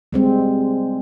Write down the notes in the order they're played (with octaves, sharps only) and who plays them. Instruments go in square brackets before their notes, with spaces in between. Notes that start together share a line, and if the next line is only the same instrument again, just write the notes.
[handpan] G3 G#3 C4